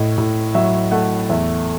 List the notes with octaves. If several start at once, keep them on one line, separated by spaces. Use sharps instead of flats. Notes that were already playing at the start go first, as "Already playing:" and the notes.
Already playing: A2 D#5
A2
F#3 E5
A3 F#5
E2 E5